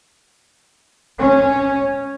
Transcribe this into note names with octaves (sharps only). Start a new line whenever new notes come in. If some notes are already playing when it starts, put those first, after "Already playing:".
C#4